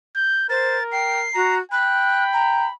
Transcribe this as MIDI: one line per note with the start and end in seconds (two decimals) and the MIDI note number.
0.16 0.48 91
0.50 1.28 70
0.50 0.76 72
0.50 0.84 93
0.92 1.20 79
0.92 1.54 96
1.35 1.60 66
1.35 1.58 82
1.71 2.70 79
1.71 2.74 83
1.71 2.24 90
2.33 2.66 82